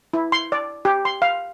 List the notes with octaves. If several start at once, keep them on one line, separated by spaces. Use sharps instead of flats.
E4
C6
D5
G4
C6
F5